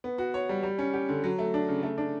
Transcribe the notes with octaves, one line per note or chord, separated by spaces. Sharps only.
B3
F#4
C#5
G3
G3
C#4
G4
D3
F#3
A3
D4
C#3
A3
D4